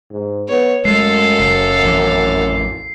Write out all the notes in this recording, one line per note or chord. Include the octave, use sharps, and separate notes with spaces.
G#2
B3 C#5
F#2 G#3 A3 A4 F5 C7
F#1 C7
A1 F2 E3